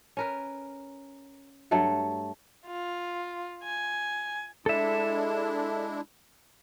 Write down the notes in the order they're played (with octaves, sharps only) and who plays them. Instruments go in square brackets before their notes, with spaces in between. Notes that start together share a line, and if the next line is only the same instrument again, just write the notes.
[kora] C#4 A#4 B4
G2 F#3 A3 F#5
[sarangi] F4
G#5
[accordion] G#3 D4 E4 [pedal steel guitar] A4 E5